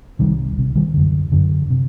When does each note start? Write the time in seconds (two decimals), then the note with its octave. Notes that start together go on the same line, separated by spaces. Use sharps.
0.19 C2 C3 D#3 G3
0.57 C2 C3
0.75 D#3 G3
0.94 F#2 D3
1.32 F#2 D3
1.70 C3